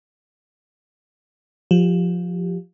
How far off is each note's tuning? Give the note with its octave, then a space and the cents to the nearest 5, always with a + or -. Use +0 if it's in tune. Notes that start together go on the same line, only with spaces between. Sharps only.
F3 +15 G4 +0